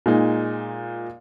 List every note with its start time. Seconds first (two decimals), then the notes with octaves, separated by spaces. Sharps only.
0.06 A#2 G#3 D#4